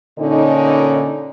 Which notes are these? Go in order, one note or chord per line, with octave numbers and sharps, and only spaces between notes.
A#2 D3 C#4 D#4